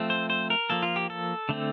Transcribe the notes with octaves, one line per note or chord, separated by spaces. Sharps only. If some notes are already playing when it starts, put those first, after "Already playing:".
Already playing: F3 A3 C4
C5
C5
A#4
F3 A#3 A4
F4
G4
A4
D3 A3 C4